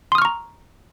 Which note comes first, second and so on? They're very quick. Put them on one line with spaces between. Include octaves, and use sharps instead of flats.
C6 D#6 F6 C#6 A#5